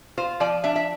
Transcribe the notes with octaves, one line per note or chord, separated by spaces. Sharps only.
F4 C5
F3 D5
D4 E5
E5